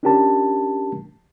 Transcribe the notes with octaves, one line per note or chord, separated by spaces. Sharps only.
C#4 D4 F4 G4 A#4 A5